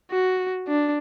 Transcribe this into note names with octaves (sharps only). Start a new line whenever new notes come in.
F#4
D4